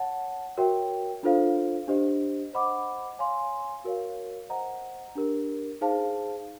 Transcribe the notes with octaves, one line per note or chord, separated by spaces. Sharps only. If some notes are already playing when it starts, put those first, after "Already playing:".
Already playing: C#5 F#5 A5
F#4 A#4 C#5 E5 G5
D4 F4 A4 C5 F5
D4 G4 C5 D#5
C5 D#5 F#5 B5 D6
C#5 F5 G#5 C6
F#4 A#4 C#5 F5
C5 D#5 F#5 A#5
D4 G4 A#4
D#4 G#4 C5 F5 A5